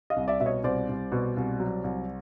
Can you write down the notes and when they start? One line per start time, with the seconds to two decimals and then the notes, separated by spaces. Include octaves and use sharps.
0.10 D#5 F5
0.16 C2
0.28 D5 E5
0.40 B2 E5
0.46 C#5 D#5
0.64 C2 C5 D5
0.89 C2
1.12 B2
1.37 C2
1.60 F#3
1.84 C2